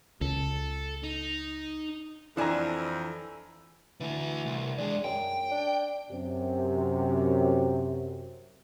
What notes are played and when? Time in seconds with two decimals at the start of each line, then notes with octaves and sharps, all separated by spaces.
0.21 C#2 A4
1.03 D#4
2.37 F2 E3 D4 E4 G#5 A#5
4.00 D3 E3 A3
4.46 C2
4.78 E2 G#3 D4
5.04 F#2 G5
5.51 D4
6.11 F#2 C3